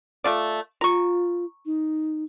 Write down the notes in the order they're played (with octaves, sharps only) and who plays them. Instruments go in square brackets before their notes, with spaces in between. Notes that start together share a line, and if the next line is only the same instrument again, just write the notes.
[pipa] A3 F4 D5
[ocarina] F4 [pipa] A#5 C#6
[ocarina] D#4